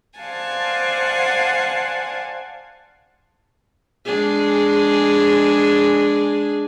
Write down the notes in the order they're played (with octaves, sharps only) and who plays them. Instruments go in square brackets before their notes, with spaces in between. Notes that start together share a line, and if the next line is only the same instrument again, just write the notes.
[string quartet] C5 D5 F5 F#5 G#5 A5
[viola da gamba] G#3 D4 G#4